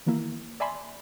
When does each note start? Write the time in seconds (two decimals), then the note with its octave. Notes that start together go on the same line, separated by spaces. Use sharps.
0.06 D#3 E3 A#3 E4
0.60 D5 E5 G#5 A5 B5 C6